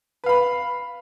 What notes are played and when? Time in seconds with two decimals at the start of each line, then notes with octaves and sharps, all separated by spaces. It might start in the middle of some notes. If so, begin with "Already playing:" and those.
0.24 B4
0.26 F5
0.29 B5